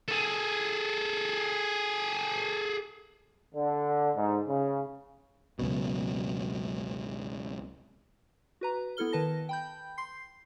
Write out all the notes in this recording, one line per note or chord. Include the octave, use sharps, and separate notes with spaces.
G#4 A4
D3
G#2
C#3
C#2 F#2 B2
F#4 B4 A#5
B3 E4 A4 F6 G7
D#3 B4 A5 A#6
G5 B5 G6
C6 C7